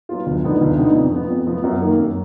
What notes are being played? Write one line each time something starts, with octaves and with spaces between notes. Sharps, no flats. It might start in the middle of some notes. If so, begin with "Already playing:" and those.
F#3 B3 F4
D2
D3 F3 B3 D#4
D2
D3 F3 B3 D#4
F2
F3 B3
F2
F3 B3
F#2
D#3 A#3
F#2